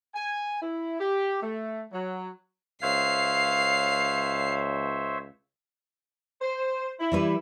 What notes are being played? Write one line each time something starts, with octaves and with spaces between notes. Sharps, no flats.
G#5
E4
G4
A3
F#3
C#2 C5 C#5 E5 F5 C7
C5
E4
E3 G3 B4